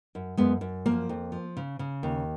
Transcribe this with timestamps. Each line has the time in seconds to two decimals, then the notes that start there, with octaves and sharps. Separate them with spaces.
0.15 F#2
0.37 F#2 G#3 B3
0.61 F#2
0.86 F3 A#3
1.09 F2
1.32 F3
1.57 C#3
1.79 C#3
2.03 D#2